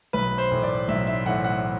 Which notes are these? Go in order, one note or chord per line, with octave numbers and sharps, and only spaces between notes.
B1 B4
C5
A2 E3
D5
B1 E5
E5
A2 E3 F#5
F#5